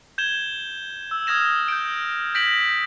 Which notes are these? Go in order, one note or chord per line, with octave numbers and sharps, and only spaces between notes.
G6 G#6 E7 G7
E6
D#6 F6 G#6 A#6 E7
G6 D7
G6 A#6 B6 D7 F#7